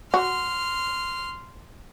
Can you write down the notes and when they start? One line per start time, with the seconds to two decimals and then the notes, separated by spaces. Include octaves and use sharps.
0.14 F#4 C6 F6